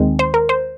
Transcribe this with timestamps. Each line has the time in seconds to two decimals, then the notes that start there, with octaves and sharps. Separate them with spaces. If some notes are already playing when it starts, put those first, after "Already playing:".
Already playing: D#2 D#3 G#3 C4
0.19 C5
0.34 A#4
0.49 C5